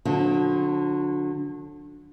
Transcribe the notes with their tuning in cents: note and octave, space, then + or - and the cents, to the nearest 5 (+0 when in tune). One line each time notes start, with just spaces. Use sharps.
D3 +0 F#3 -40 C4 +0